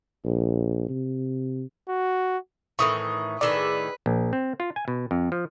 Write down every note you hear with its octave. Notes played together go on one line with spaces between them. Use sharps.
A#1
C3
F#4
A2 D#3 E3 C#6 D#6
A2 D#3 G#4 B4 D5 E6
A#1
C4
F4
G#5
B2
F2
F3